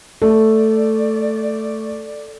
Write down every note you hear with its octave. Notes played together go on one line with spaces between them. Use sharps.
A3 A4 D5